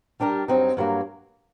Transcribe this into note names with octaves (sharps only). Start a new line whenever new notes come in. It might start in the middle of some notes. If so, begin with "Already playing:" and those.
G3 D4 G4 A#4
G2 F#3 C4 D#4
G2 F#3 A#3